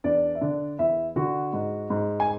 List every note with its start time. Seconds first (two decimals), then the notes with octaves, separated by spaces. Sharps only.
0.04 E2 D4 D5
0.35 E5
0.41 D3 D4 D5
0.78 E2 E4 E5
1.16 D3 F#4 F#5
1.53 G#2
1.90 G#2
2.20 G#5